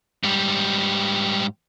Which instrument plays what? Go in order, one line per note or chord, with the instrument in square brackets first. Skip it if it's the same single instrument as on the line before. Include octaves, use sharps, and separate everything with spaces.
[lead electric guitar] G#2 G3